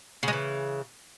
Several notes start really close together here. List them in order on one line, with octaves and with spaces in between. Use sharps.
C#3 G#3 E3